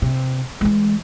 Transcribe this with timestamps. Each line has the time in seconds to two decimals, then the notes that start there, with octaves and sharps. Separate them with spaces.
0.02 C3
0.61 E3 G#3